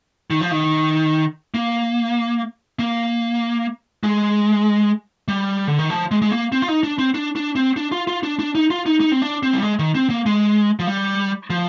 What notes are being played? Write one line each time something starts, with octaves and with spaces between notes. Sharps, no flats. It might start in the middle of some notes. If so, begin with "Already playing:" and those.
D#3
F3
D#3
A#3
A#3
G#3
G3
D3
D#3
F3
G#3
G#3
A#3
C4
F4
D#4
D4
C4
D4
D4
C4
D4
F4
F4
D4
D4
D#4
F4
D#4
D#4
C4
D4
C4
G3
G#3
D#3
C4
A#3
G#3
F3
G3
F3